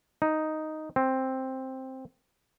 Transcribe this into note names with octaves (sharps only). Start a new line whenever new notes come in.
D#4
C4